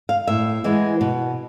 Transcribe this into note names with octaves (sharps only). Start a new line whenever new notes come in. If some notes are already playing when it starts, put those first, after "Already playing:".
F5
A2 E5
E3 G#3 B3 E4
B2